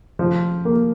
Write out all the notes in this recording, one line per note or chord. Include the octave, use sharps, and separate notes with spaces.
F3
A#3